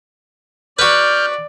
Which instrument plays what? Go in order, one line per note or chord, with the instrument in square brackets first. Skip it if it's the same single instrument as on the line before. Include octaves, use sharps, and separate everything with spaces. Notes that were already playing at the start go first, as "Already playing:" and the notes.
[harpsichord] F#4 B4 [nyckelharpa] D5 [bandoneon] F6 G6